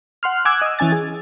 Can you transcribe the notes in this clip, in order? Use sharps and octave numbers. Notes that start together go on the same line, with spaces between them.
F#5 C6 F6
F#5 G#5 D6 E6 F#6 G#6
D#5 E6
E3 C#4 G#5 A6
G#4